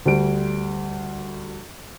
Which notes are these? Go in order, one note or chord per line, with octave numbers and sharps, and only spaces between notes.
D2 G3 D7